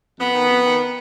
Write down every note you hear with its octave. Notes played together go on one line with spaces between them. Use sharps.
F2 B3
D#3
F2
D#3